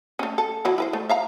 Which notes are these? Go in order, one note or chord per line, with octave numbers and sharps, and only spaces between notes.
A3 C#4
A4
E3 F#3 E4
E4 B4 C5
A3
E5 F5 A#5